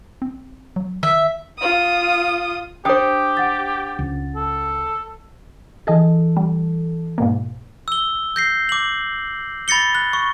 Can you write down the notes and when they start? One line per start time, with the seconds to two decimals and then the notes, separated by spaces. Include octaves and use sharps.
0.22 C4
0.76 F#3
1.03 D#3 E5
1.59 F4 D#6
2.85 D4 G4 C5 G5 D#6
3.37 F#5 A6
3.99 C#2
4.35 A4
5.87 E3 G#4 A4 D#5
6.37 G3
7.18 G#2 B2 A#3
7.88 E6 G7
8.36 G6 A#6 C7
8.69 D6 F#7
9.68 B5 A6 A#6 C#7 G7
9.95 F#6
10.13 C#6